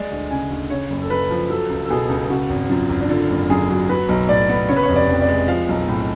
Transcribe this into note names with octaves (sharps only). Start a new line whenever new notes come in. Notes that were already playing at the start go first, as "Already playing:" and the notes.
Already playing: G#3 D5
D2
C#3 G#5
D2
C#3 C#5
F#1
A4
F#2 B4
F3
F#3 A4
C#2
A4
B2 G#4
C#2
C#3 F#4
G#1
F#2 F4
G#1
D4
D3 F4
F#1
F#2 G#4
F#3
F#3 B4
B1
A2 D5
B3
C#3 C#5
B4
C#5
F1
D5
F2
D5
G#3
F3 F5
B1
A2